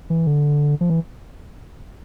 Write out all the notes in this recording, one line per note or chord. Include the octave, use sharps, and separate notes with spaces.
E3
D3
F3
E3